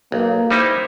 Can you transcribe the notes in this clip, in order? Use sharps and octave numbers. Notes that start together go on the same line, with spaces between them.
B1 A#3
G3 D#4 E4 C5